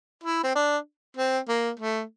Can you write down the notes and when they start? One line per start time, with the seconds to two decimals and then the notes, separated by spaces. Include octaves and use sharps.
0.24 E4
0.43 C4
0.55 D4
1.17 C4
1.48 A#3
1.79 A3